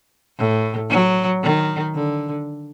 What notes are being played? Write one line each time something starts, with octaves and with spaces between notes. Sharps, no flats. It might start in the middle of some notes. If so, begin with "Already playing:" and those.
A2
F#3
D#3
D3